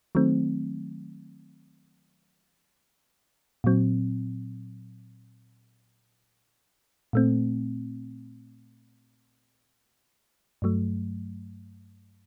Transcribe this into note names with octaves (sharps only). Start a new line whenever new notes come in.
D#3 F#3 A3 C4
A#2 F#3 C4
A#2 A3 C4
G2 F#3 A3